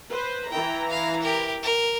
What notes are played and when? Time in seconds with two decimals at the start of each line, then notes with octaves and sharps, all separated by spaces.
0.11 B4 C5
0.51 E3 E4 G5 A#5
0.90 F5
1.22 G4 A#4
1.63 A#4